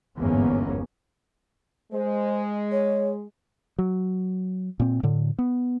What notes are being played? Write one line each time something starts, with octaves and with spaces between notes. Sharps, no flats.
G1 E2 G#2 A#3 B3 C#4
G#3 C5
C#5
F#3
A#2 C4
A2 D3
B3